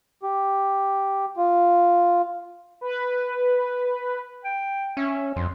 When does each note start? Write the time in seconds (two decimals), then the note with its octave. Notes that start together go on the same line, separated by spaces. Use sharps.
0.23 G4
1.37 F4
2.81 B4
4.44 G5
4.97 C#4 E5
5.36 F2 C6